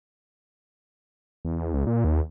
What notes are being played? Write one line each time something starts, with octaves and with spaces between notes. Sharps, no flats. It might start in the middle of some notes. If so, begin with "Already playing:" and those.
E2
C#2
A#2
D#2